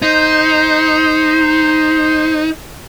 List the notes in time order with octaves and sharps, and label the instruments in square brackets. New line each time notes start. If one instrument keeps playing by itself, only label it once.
[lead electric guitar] D#4 [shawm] C5